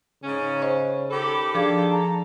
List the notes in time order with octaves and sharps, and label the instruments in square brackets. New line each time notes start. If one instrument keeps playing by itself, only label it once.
[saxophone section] G#2 C#4 [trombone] C#3
[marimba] C5 D#5 C#6
[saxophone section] D#3 G4 A4 [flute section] B5 D6
[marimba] F3 G#4 G#6 [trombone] D4 [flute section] F5
[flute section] A5 A#5